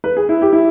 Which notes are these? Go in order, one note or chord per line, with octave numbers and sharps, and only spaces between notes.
B4
G#4
E4
G4
E4